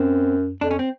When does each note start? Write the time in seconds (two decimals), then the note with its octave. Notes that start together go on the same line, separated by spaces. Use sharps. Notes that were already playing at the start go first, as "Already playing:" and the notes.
Already playing: F#2 C4
0.61 F2 D4
0.71 C#4
0.79 C4